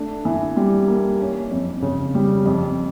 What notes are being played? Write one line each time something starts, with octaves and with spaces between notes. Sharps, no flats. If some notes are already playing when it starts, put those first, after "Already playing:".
Already playing: A3 D4
E3
G3
A#3
C#4
F2
C#3
G3
F2